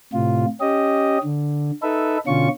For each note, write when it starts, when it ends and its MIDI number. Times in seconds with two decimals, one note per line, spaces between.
0.13 0.46 45
0.13 0.46 48
0.13 0.46 65
0.61 1.18 61
0.61 1.18 67
0.61 1.18 75
1.24 1.71 50
1.83 2.18 63
1.83 2.18 69
1.83 2.18 71
1.83 2.18 76
2.27 2.48 47
2.27 2.48 50
2.27 2.48 61
2.27 2.48 65
2.27 2.48 85